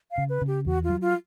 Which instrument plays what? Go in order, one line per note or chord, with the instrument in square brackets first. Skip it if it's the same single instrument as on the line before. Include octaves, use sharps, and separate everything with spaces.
[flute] F5
[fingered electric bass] C#3
[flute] B4
[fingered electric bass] C#3
[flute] G4
[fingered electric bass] E2 [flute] F#4
[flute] F4
[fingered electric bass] F#3
[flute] F4